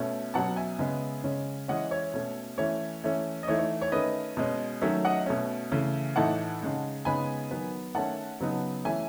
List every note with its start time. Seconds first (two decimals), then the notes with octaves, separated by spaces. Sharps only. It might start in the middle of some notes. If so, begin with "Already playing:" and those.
Already playing: B2 A3 C#4
0.34 B2 F#3 C#4 F#5 A5
0.56 E5 G#5
0.79 C#3 G#3 B3
1.24 C#3 G#3 C#4
1.68 E3 G#3 C#4 D#5 F#5
1.91 C#5 E5
2.14 B2 A3 C#4
2.58 E3 A3 C#4 C#5
3.04 E3 A3 C#4
3.43 D#5
3.48 E3 A3 D#4 C#5
3.59 C#5
3.82 C#5
3.92 D#3 A3 C#4 B4 D#5
4.37 B2 G#3 C#4
4.82 D#3 F#3 A3 C#4 C#5 E5
5.05 D#5 F#5
5.26 B2 A3 C#4
5.71 C#3 E3 A3 C#4
6.16 A2 E3 A3 D#4 F#5 A5
6.61 C#3 G#3 D#4
7.05 C#3 G#3 B3 D#4 G#5 B5
7.51 D#3 F#3 B3
7.95 D#3 A3 C#4 F#5 A5
8.40 C#3 F#3 B3 D#4
8.84 E3 A3 C#4 E5 G#5